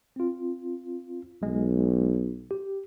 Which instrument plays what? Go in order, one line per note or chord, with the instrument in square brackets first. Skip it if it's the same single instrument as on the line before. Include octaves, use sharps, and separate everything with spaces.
[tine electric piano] C4 F4
[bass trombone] B1 [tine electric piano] G#3
[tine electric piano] G4